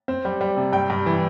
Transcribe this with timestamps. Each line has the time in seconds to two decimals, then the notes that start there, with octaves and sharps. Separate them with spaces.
0.08 C4
0.25 G3
0.41 G3
0.57 C3
0.73 G2 G5
0.90 G2
1.06 E3